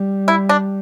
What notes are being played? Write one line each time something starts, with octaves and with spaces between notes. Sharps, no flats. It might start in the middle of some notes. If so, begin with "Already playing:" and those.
Already playing: G3
E4
D4